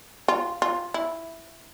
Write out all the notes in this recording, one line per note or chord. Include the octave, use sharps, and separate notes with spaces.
F4
F4
E4